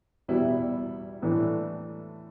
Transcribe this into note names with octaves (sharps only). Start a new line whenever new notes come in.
E2 B2 G3 B3 E4
A2 E3 A3 D4